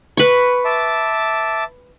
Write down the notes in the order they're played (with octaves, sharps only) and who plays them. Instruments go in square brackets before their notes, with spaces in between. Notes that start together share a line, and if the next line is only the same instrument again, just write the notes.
[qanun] B4 C#6
[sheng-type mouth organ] E5 A5 D6